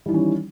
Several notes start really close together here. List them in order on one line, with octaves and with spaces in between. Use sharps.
G3 E3 D#3 C#4